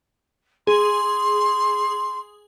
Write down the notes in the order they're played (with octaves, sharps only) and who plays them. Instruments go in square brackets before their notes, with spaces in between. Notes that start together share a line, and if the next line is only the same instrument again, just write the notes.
[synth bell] G#4 [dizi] C6